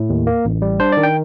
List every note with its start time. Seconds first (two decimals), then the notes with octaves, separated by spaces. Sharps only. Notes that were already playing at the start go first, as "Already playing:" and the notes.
Already playing: A2
0.09 D#2
0.27 A#3
0.45 A1
0.62 G3
0.80 D4 C5
0.92 D#3 D5
1.03 G5